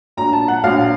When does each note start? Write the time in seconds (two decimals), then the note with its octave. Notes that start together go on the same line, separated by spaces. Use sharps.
0.17 A#1 A#2 F#3 A#5
0.33 A5
0.48 F#5
0.63 A#1 A#2 F#3 F5